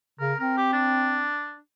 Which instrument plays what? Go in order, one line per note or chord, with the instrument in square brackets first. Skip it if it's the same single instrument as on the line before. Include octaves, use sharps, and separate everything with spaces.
[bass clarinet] C#3 [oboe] A#4
[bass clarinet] C4 [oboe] A#4
[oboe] G4
D4